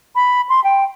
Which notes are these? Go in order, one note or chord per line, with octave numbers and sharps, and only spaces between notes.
B5
C6
G5